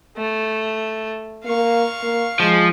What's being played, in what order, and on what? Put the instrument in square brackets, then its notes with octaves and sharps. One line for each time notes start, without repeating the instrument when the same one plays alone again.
[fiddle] A3
[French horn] A#3 [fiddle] F5 C#6
[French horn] A#3
[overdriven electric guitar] F3 [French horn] G#3